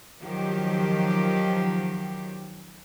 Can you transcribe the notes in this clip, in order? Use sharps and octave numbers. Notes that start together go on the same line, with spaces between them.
D#3 F3 F#3 G4